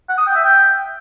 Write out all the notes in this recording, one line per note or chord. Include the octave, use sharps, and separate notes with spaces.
F#5
D#6
G5
E5
G5